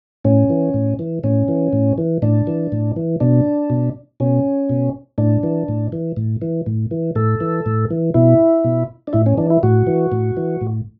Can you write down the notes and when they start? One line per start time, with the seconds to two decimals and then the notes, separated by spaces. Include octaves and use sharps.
0.25 A2 C#4
0.50 E3
0.74 A2
0.99 E3
1.24 A2 C#4
1.48 E3
1.73 A2
1.98 E3
2.22 A2 D4
2.47 E3
2.72 A2
2.96 E3
3.20 B2 D4
3.70 B2
4.20 B2 C#4
4.70 B2
5.18 A2 D4
5.43 E3
5.68 A2
5.92 E3
6.17 A2
6.42 E3
6.66 A2
6.91 E3
7.15 A2 A4
7.40 E3
7.66 A2
7.91 E3
8.14 B2 E4
8.64 B2
9.07 D4
9.13 A2 E4
9.26 C#4
9.37 E3 D4
9.50 E4
9.63 A2 F#4
9.87 E3
10.12 A2
10.37 E3
10.61 A2